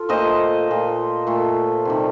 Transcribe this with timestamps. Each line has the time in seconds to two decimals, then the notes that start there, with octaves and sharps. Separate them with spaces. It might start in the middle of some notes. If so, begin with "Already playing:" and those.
Already playing: F4 A4
0.09 A#2 A3 C5 D#5
0.67 A#2 A3
1.27 A#2 A3
1.85 C3 D#3 G3